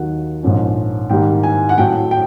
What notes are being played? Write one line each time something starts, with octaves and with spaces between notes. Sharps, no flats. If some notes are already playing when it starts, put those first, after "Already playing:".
Already playing: D#2 D#3 F#3 F#5
A#1 G#2 F3 A#3 C#4
G#2 D#3 G3 A#3 G5
G#5
F#5
A2 F#3 A3 G5
G5